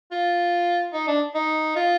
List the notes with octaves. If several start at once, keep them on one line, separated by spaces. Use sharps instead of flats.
F4
D#4
D4
D#4
F4